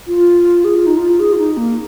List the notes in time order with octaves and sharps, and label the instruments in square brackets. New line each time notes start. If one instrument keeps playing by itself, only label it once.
[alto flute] F4
G#4
F4
D#4
F4
G#4
F4
D#4
A#3